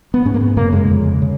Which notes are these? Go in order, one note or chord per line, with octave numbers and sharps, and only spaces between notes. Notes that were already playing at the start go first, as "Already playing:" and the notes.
B3
G#2 C#4
A#3
B3
F#2 C#3 A#3
G#3
F2 C#3
C#3